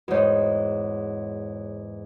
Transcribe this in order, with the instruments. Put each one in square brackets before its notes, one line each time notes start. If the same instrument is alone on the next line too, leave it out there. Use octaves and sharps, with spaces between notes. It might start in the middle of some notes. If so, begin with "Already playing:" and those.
[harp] E2 G#2 [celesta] F#4 C#5